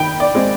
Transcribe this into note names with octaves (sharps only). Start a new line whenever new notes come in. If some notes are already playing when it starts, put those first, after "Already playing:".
Already playing: D#3 G5 B5
D5
G#3 C4